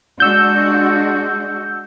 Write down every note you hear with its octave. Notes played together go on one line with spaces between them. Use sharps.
G#3 D4 F#4 E6 G6